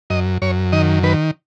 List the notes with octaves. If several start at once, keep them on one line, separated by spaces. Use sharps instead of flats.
F#2 D#5
F#2 C#5
D#3 D#5
D#3 B4